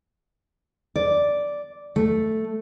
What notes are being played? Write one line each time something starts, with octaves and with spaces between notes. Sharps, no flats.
D5
A3